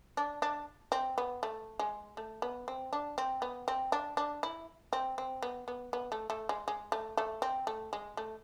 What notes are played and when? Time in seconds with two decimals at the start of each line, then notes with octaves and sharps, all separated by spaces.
0.17 D4
0.42 D4
0.92 C4
1.18 B3
1.43 A3
1.79 G#3
2.17 A3
2.42 B3
2.68 C4
2.93 D4
3.18 C4
3.42 B3
3.68 C4
3.92 D4
4.17 D4
4.43 E4
4.93 C4
5.18 C4
5.42 B3
5.68 B3
5.93 B3
6.12 A3
6.30 A3
6.49 G#3
6.68 G#3
6.92 A3
7.17 A3
7.42 C4
7.67 A3
7.93 G#3
8.17 A3